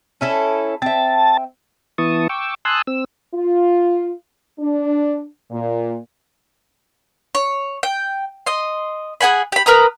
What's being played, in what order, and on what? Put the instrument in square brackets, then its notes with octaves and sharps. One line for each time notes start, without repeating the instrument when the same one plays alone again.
[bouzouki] C#4 E4 A4
[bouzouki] C4 E5 [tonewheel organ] A5
[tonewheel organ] E3 B3 E4 A5 C#6 D#6
G5 C#6 D6 E6
G#5 A5 C6 D#6 E6 F#6
C4 E6
[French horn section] F4
D4
A#2
[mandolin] C#5
G5
D#5 C6
G#4 F#5 G#5 B5
G4 B5
A#4 B4 A#5 D#6